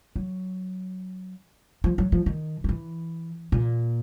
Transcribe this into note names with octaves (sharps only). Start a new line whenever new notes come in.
F#3
F3
F#3
F3
D#3
F3
E3
A#2